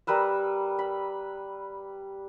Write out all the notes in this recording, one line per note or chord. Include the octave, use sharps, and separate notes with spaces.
G3 A#4 B4 E6
B5